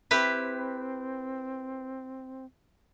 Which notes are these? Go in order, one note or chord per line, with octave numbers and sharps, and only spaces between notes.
C4 E4 G4 B4